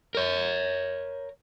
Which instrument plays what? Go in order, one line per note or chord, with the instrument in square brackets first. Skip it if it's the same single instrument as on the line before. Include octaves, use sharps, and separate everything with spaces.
[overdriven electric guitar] A#4 C#5